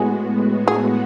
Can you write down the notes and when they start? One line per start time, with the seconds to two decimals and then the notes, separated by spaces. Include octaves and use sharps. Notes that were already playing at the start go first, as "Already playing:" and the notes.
Already playing: A2 G#3 B3 F#4 G#4
0.68 G#4